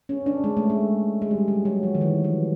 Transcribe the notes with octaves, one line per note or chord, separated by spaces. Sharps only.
C#4
D4
G#3
A3
G#3
G#3
G3
F#3
F#3
F3
D#3
E3
F3